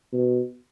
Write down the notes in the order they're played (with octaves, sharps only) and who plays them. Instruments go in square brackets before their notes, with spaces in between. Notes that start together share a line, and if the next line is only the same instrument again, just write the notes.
[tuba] B2